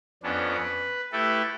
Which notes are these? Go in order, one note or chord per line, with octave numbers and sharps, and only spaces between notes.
F2 B3 C#4 D4
B4
A3 E4 G4 A4 B4